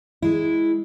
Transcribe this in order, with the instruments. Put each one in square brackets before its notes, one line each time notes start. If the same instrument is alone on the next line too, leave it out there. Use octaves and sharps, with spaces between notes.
[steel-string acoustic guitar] G#3 E4